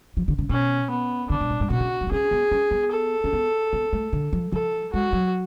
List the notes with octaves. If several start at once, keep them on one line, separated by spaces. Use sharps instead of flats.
F3
D3
C#3
B2 C#4
B3
D3 D4
B2
A2
G#2
B2 F#4
C#3
F#3
B3
C#4 G#4
B3
C#4
B3
A4
C#4
B3
B3
A3
D3
F3
F3 A4
G#3 F#4
F#3